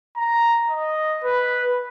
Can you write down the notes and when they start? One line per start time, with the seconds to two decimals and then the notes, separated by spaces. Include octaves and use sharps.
0.16 A#5
0.69 D#5
1.24 B4